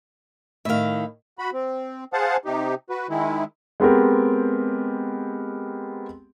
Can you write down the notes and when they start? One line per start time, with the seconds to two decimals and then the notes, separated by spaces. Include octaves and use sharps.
0.65 A2 D#3 E5 F5
1.39 F#4 B5
1.53 C4
2.13 G#4 C5 F5 F#5 A5
2.45 C3 D#4 G4
2.90 F#4 B4
3.09 D#3 G#3 E4
3.80 G#3 B3 C4 G4 A#4